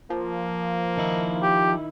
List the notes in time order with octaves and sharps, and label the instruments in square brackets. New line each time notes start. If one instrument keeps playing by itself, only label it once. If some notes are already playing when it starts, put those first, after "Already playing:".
[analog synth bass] F3 [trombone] A#3
[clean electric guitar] D#3 D#4 E4
[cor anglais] G4